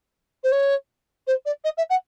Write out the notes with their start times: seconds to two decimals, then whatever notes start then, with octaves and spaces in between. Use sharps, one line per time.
0.44 C5
0.52 C#5
1.27 C5
1.46 D5
1.64 D#5
1.78 E5
1.90 F#5